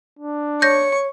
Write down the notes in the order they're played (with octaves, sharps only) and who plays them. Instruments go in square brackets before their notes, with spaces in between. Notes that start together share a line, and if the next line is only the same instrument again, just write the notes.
[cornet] D4
[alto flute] C#5 [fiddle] C#6 [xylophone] G6 A#6